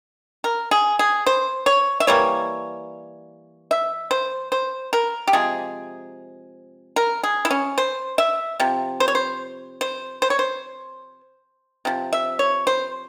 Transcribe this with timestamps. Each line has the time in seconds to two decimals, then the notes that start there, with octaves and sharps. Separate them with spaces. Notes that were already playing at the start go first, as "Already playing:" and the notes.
0.44 A#4
0.71 G#4
0.99 G#4
1.27 C5
1.66 C#5
2.00 E5
2.07 E3 G3 A#3 C#5
3.71 E5
4.11 C5
4.52 C5
4.93 A#4
5.27 G4
5.33 C3 F3 G#3 G#4
6.96 A#4
7.23 G#4
7.45 E4
7.51 C#4
7.78 C5
8.18 E5
8.60 C3 F3
9.00 C5
9.08 C#5
9.15 C5
9.81 C5
10.22 C5
10.30 C#5
10.39 C5
11.85 C3 F3
12.13 E5
12.39 C#5
12.67 C5